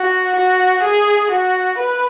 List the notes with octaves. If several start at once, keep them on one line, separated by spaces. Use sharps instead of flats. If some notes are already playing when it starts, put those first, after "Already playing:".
Already playing: F#4
F#4
G#4
F#4
B4